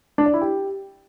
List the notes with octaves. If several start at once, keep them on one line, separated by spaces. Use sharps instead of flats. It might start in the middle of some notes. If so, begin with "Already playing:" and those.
D4
D5
E4
G4